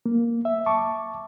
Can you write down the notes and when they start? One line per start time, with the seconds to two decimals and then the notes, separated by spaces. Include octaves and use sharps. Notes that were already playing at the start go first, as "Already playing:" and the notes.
0.06 A#3
0.45 E5
0.66 A5 C#6 D6